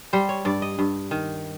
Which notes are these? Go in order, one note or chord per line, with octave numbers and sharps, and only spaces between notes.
G3 C5
C#5
G2 D5
D#5
G2
D#3